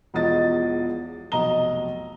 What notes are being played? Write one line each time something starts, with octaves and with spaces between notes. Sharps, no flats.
E1 E2 F3 D#5 A6
F1 B1 D#5 A#5 G7